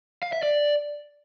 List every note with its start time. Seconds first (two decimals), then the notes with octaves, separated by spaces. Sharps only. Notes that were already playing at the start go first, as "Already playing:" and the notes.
0.23 F5
0.33 E5
0.43 D5